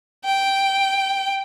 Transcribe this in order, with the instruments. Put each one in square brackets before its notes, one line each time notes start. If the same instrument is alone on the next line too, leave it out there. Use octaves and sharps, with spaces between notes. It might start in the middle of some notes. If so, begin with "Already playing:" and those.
[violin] G5